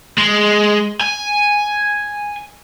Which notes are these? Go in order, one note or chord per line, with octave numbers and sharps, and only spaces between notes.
G#3
G#5